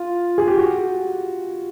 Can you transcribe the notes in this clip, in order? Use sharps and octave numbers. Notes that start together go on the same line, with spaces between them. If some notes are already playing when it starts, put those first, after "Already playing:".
Already playing: F4
G#4
G4
F#4